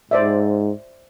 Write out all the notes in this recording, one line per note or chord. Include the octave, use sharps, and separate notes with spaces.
G#2 C5 D5 E5